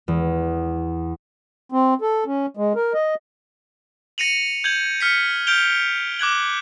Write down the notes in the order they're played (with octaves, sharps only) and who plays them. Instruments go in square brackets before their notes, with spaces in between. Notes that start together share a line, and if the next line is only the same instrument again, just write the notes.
[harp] E2
[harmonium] C4
A4
C#4
G#3
A#4
D#5
[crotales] A#6 C#7 D#7 F7 F#7
G6 G#6 F#7
F6 B6 C#7
F6 G6 D7 F7 G7
D6 F#6 G#6 F#7